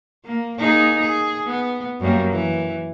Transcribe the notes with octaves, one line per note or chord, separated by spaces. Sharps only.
A#3
A#3 D#4 G#4
G#4
B3
F#2 G3 A#3
E3